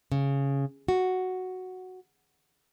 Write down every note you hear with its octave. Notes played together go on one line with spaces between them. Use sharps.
C#3
F#4